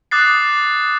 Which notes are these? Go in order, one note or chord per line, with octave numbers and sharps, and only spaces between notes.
D6 D#6 F#6 A6 C7